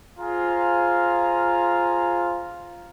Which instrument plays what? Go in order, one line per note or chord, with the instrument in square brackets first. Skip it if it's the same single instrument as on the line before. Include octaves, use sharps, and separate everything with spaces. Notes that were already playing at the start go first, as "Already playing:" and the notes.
[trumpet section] F4 G#4 C5 F5 A#5